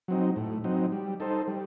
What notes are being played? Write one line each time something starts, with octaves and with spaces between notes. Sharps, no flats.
F#3 C4 D#4
A2
F#3 C4 D#4
G3
D#4 A4 C5
G3